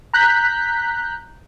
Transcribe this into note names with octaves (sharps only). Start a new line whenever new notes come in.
A#5 F#6 G6 B6